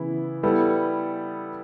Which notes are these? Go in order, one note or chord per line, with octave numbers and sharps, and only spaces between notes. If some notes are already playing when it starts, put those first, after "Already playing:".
Already playing: C#3 E3 B3 E4
G3 B3 E4 A4